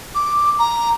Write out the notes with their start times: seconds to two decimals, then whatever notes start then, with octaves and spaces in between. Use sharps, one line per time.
0.14 D6
0.59 A#5